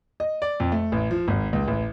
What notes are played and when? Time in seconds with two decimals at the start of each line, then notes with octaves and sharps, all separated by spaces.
0.20 D#5
0.42 D5
0.60 F2
0.72 A3
0.92 A1
1.11 F3
1.28 G#1
1.53 C#2
1.68 A1